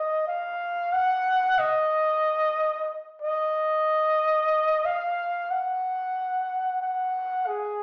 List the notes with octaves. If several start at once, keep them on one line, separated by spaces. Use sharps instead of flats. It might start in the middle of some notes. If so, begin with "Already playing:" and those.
Already playing: D#5
F5
F#5
D#5
D#5
F5
F#5
F#5
G#4